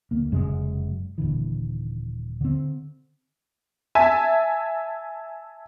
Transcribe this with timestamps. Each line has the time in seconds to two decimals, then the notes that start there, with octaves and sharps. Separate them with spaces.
0.11 D2 A#3
0.31 F1 F#2 C#3 G#3
1.18 D#1 D3 E3
2.41 D3 C4
3.95 E5 G#5 A5